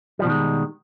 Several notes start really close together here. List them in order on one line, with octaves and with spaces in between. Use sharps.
G3 F3 B2 D#3 G#3